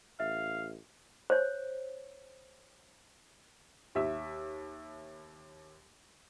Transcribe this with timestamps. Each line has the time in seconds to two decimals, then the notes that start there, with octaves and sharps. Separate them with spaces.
0.20 A1 E5 F5
1.30 C5 C#5
3.95 D#2 E5 E6